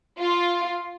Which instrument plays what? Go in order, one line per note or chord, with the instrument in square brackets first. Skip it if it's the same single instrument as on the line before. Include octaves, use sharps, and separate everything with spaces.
[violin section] F4